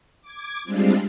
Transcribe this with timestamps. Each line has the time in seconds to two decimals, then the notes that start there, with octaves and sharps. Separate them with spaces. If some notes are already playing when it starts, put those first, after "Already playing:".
0.21 D6 G#6
0.64 G3 G#3 C4 D4 F4